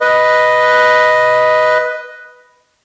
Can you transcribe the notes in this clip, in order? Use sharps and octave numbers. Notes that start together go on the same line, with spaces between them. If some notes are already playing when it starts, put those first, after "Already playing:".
B4 D#5